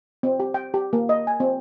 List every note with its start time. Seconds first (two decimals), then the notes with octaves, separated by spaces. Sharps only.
0.23 C4
0.40 G4
0.54 G5
0.74 G4
0.93 A#3
1.09 D#5
1.27 G#5
1.40 C4